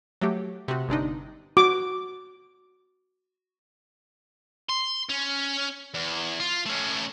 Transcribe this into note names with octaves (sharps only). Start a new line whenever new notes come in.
F#3 A3 G4
C3 F#4
G1 C3 D4 D#4
F#4 D6
C6
C#4
E2
F4
A3 C#4